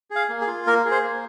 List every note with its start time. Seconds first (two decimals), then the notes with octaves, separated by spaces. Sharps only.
0.10 G#4
0.16 F5
0.29 A#3
0.41 G#4
0.47 F4
0.67 A#3 A#4
0.85 G#4
0.91 C5
1.03 A#3